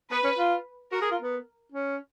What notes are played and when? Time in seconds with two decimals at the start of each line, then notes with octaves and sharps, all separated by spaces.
0.11 B3 B4
0.24 C#4
0.38 F4
0.92 F#4 A#4
1.02 G#4
1.11 F4
1.22 B3
1.72 C#4